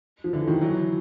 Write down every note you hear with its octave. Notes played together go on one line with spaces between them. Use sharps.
F3
D3 E3
D#3 F3
E3 F#3